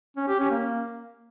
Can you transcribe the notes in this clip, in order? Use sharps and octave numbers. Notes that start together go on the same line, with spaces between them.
C#4
G4
C#4
A#3